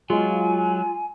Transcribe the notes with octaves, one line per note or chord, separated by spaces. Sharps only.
F#3 G#3 F4 D#5 G#5